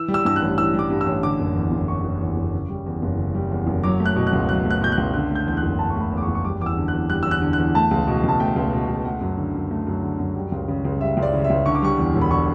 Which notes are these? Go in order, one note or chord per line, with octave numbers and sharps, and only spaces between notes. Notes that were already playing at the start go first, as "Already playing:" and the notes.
Already playing: E3 E6
G3
E6
G2 E6
F#6
A1
E3 E6
G3 D6
G2
E6
A1
D3 D6
F#1
E2
F#1
D3 C#6
F#1
E2
F#1
C#3
G3
E2
F#1
C#3
G3
E2
F#1
F#3 D6
A3
F#6
B2
F#6
C#2
F#3 F#6
A3
F#6
B2 G6
F#6
C#2
D3 F#6
A3 G6
E2 G6
F#6
F#1
D3 A5
C#6
A3
B5
E2
D6
C#6
F#1
C#6
G3 D6
E2 D6
E6
D3
F#6
E2
G3 F#6
E2 E6
F#6
D3
E2 F#6
A3 A5
C#2
B2
C#2 A5
A3 G5
C#2
B2
C#2
A3 F#5
F#2
D3
F#2
A3
F#2
D3
F#2
G3
C#2
C#3
C#2
G3 E5
C#2
D5
C#3
E5
C#2
D3 C#6
D6
G3 C#6
E2
E1
B5
D3 C#6